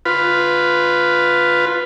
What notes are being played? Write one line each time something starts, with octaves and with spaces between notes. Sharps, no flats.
F4 B4